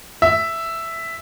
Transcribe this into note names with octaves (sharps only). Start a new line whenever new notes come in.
E5